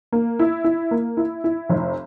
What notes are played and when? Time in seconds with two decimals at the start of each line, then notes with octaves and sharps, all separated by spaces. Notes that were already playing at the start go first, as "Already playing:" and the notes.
0.12 A#3
0.39 E4
0.64 E4
0.91 A#3
1.17 E4
1.44 E4
1.69 F1